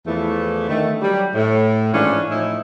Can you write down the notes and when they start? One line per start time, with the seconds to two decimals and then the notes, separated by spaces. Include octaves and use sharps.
0.06 E2 E3 F3 A3
0.68 D3 D#3 A3
1.01 F#3 G3
1.35 A2
1.93 G#2 E3 F3 C#4 D4
2.29 A2 F3 D#4 E4